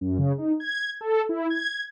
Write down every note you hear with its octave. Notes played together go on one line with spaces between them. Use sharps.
F#2
C#3
D#4
G#6
A4
E4
G#6